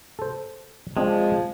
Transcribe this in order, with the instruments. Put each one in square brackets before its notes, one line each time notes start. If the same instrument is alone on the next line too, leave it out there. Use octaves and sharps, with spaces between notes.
[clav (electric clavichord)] A4 C5
[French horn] F3 [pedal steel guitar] G#3 [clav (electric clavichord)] C4 D4 D#5